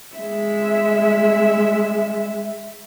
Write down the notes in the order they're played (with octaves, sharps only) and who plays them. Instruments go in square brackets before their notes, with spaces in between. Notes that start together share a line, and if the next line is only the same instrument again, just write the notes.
[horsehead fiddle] G#3 E5